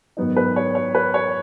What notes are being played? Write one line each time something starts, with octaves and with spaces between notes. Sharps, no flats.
G#2 D#3 F#3 B3 D#4
B4
C#5
C#5
B4
C#5